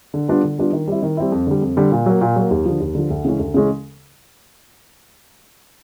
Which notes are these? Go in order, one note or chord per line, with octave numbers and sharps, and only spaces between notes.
D3
G3 B3 D4 F4
D3
G3 B3 D4 F4
D#3
G3 C4 E4
D#3
G3 C4 E4
F2
D3 G3
F2
D3 G3
A#2
F#3 A#3
A#2
F#3 A#3
D#2
D3 F3
D#2
D3 F3
D2
C#3 E3 G#3 C#4
D2
C#3 E3 G#3 C#4